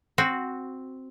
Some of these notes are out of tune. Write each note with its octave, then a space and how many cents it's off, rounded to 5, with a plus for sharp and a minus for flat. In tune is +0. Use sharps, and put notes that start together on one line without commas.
C4 +0 F#4 -5